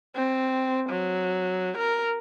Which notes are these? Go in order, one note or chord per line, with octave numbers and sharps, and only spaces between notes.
C4
F#3
A#4